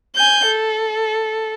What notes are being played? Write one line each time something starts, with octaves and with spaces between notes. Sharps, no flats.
G#5 G6
A4